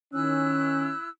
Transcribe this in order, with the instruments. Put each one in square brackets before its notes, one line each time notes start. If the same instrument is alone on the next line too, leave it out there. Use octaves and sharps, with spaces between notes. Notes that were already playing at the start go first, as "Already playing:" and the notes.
[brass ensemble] D#3 C#4 [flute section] E4 E6 F#6